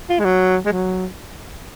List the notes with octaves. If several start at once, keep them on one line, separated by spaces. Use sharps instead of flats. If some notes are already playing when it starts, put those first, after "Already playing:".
F4
G#3
F#3
G#3
F#3